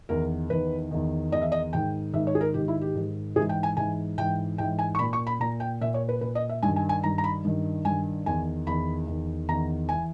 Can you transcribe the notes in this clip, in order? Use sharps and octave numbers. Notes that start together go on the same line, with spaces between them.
E2 D#3 A#4
E2 D#3 B4
E2 D#3
E2 D#3 D#5
E5
D#5
G#2 D#3 G5
G#2 D#3 E5
C#5
G#4
A#4
G#2 D#3 G4
E4
G4
G#2 D#3
G#2 E3 G#4
G5
G#5
G#2 E3 G#5
G#2 E3 G5
G#2 E3 G5
G#5
C#6
A#2 B5
C#6
B5
A#2 A#5
G5
A#2 E5
C#5
B4
A#2 B4
D#5
E5
G2 D#3 G#5
G#5
G#5
G2 D#3 A#5
A#5
B5
G2 D#3
G2 D#3 G#5
E2 D#3 G#5
E2 D#3 B5
E2 D#3
E2 D#3 A#5
E3 G#5